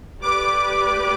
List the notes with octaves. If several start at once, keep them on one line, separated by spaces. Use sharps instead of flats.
A3 G4 B4 D5 D6